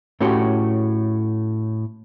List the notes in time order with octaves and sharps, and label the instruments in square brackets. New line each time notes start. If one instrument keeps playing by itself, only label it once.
[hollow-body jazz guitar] A2 A3 C#4 F#4 G4 C6